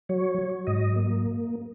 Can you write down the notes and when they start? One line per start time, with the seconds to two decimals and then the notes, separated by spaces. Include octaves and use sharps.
0.09 F#3 C#5
0.38 F#3
0.67 G#2 D#5
0.96 A#3